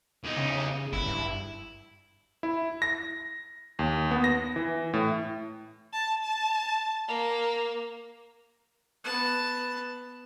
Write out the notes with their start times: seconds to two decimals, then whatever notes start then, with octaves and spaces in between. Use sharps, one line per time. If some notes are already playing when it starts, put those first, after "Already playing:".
0.24 E2 D#4
0.37 C#3
0.93 G1 E4
1.06 G2
2.43 E4
2.82 A#6
3.79 D#2
4.11 B3
4.24 A#6
4.56 E3
4.93 A2
5.93 A5
6.23 A5
7.08 A#3
9.04 B3 A5